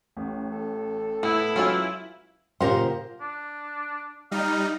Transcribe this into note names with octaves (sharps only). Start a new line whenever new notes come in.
A1
A4
A2 B3 E4
E3 F#3 G#3 C#4 F4
A#2 C#3 F4 G4 A#4 C5 F#5
D4
G3 D#4 F5